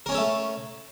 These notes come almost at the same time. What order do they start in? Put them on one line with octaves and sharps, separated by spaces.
A#4 C#4 C#5 A4 A3